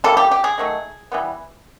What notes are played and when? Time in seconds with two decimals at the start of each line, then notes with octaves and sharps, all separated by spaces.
0.04 E3 G3 A#3 A4
0.17 G4
0.31 G4
0.44 G#4
0.58 D#3 F#3 A3
1.12 E3 G3 B3